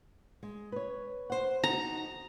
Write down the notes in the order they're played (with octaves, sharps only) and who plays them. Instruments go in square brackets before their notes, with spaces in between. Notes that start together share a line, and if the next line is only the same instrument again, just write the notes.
[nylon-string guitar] G#3
B4 C#5
C5 F#5
[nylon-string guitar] D#4 F#4 [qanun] A#5